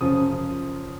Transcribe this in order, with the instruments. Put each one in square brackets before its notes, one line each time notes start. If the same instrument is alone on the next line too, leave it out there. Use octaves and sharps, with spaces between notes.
[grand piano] F#2 C#3 F3 D#6